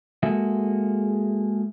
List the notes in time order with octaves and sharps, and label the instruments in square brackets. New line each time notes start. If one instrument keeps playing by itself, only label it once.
[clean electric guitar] G#3 A#3 F#4 G#4 A4 E5